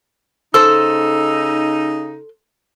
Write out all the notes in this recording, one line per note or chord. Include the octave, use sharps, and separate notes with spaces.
C#3 D#4 A4 C5 E6